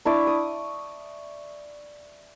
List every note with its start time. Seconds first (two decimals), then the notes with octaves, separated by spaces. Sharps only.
0.05 D4 E4 C#6 D6
0.27 D#6